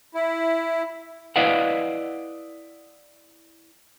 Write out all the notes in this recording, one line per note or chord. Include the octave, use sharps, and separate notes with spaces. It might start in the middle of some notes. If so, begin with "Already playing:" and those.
E4
E4 B4 D5 D#5 F5 F#5